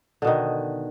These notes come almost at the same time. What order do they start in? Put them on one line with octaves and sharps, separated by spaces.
D3 B2 D#3